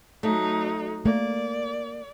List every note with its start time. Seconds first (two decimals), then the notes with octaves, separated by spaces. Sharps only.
0.23 F#3 A3 D#4
1.05 A3 A#3 D5